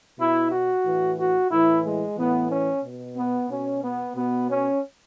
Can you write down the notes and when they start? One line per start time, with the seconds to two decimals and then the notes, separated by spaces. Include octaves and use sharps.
0.19 B2 E4
0.51 F#4
0.84 A2 E3
1.18 F#4
1.50 A2 E3 E4
1.85 G#3
2.17 A2 E3 B3
2.50 C#4
2.84 B2
3.16 B3
3.50 B2 C#4
3.82 B3
4.15 B2 B3
4.49 C#4